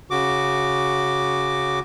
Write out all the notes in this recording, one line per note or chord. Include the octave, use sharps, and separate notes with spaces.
C#3 F#4 D6